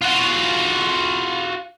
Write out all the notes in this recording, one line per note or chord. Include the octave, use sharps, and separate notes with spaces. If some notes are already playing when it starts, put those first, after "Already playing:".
F4 F#4